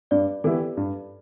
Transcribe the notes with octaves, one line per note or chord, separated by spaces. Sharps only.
G2 D5
E3 B3 E4 G4 A4
G2